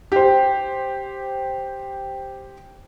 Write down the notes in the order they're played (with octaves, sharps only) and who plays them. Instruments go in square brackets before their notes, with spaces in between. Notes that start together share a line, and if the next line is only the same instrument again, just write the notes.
[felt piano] G4 C5